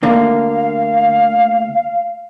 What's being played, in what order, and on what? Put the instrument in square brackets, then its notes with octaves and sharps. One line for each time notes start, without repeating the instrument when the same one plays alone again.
[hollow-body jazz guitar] D2 D3 A#3 [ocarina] F5